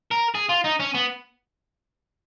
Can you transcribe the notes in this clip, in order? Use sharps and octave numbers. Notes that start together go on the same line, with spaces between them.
A#4
G#4
F4
D#4
C#4
B3